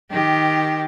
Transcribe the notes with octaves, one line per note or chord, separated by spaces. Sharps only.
D#3 G4